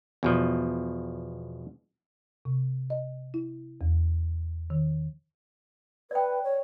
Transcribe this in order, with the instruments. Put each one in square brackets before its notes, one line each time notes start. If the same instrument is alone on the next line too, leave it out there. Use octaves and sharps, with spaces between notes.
[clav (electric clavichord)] E2 B2 F3
[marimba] C3
D#5
E4
E2
D#3
[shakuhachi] B4 [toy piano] D5 G5
[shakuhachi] C#5